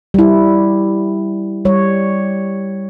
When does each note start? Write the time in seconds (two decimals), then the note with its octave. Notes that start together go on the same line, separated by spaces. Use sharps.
0.14 G3 E4
1.65 G3 C#5